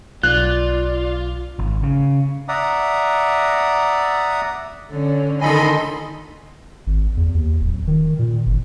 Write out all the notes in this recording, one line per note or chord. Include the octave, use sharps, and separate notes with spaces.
B1 F4 D5 F#6
G#1
C#3
D5 E5 F#5 A#5 D#6
D3 C#4
D3 D#3 D#4 A4 D#5 G#5 B5 C6
G#1
E2
D#2
D1
D#3
A#2
G1